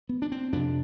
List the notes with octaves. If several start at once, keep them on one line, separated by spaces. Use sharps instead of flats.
B3
D4
C4
F2 C3 D4